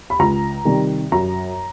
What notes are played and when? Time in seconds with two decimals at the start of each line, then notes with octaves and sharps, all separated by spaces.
0.10 B5
0.19 C#2 A#5
0.65 C3 D#3 G3
1.12 F#2 A#5